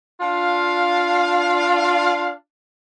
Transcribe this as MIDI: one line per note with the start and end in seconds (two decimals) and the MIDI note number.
0.20 2.32 62
0.20 2.32 65
0.20 2.32 77